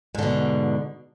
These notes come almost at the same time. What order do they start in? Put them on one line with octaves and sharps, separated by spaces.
G#2 D3 B2